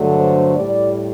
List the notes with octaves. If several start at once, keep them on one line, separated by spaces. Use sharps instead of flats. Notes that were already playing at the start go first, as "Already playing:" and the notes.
Already playing: G2 D3 F#3 A3
C5
A2 G3 D5